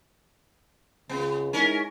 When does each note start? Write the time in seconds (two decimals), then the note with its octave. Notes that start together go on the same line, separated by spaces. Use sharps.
1.09 C#2 C#3 B3
1.53 G#3 C#4 D#4 E4 A#4